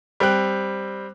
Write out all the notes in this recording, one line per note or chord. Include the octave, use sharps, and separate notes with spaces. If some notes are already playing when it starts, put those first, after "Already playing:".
G3 C4 G5 F#6